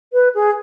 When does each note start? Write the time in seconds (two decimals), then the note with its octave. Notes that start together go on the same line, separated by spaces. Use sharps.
0.12 B4
0.34 G#4